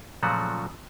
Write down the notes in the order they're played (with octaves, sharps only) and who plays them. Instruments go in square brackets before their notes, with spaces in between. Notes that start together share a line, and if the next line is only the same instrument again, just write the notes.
[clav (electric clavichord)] A#2 C#3 F3 F#3 A3 F#4